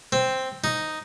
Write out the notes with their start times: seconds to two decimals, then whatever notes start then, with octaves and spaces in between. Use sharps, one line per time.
0.12 C4
0.64 D#4